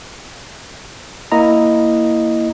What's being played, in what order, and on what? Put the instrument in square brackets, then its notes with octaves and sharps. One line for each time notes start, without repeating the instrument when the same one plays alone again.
[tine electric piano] A#3 E4 D#5 A#5